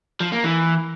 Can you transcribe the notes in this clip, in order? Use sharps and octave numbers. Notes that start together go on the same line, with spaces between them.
F3
A#3
E3